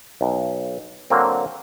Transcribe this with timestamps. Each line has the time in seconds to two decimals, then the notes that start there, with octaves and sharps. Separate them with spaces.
0.21 B1
1.10 D3 F#3 A#3 C4